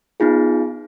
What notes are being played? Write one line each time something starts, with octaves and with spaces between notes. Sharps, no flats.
B3 D#4 F4 G#4